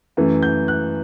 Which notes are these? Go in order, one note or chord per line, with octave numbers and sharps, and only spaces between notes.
F#2 E3 A3
G6
F#6